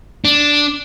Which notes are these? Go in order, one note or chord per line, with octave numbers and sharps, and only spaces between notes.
D4